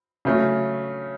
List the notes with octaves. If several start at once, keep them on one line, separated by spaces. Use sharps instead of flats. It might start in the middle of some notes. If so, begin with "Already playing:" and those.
C#3 F#3 A3 C#4